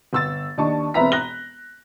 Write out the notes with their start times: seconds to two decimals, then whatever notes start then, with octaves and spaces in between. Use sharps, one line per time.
0.13 G1 E6 A6
0.58 D#2 D4 D#5 A5 C#6
0.94 E1 C4 B4 E5 A#5 B6
1.12 F#6 A#6 G7